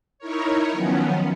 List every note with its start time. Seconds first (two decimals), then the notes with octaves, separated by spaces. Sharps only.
0.18 D#4 E4 A#4 C#5
0.72 D#3 F3 F#3 B3 C#4